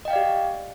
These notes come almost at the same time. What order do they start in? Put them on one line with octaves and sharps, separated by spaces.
D#5 G5 F5 D5 G4